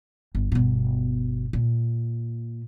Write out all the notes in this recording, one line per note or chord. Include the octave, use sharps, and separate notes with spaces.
G1
G1 B2
A#2